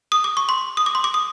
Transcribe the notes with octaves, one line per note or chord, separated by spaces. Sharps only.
D#6
D6
C#6
C6
D#6
D6
C6
D6
D#6